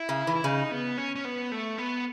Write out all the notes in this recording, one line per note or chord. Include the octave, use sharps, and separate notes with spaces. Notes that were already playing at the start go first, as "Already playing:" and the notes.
Already playing: E4
C#3
E3
E4
C#3 D#4
B3
C#4
C#4
B3
A3
B3